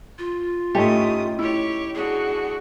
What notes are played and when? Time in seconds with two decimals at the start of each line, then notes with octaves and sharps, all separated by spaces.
0.19 F4
0.75 A2 A3 C#4 D#4 G4 D#6
1.39 E4 G4 C#5
1.95 D3 F#4 G#4